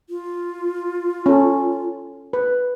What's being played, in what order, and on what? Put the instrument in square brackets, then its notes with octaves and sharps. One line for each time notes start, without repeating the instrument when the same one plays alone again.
[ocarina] F4
[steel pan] C#4 A4
B4